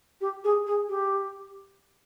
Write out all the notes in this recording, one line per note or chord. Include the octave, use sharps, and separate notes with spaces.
G4
G#4
G#4
G4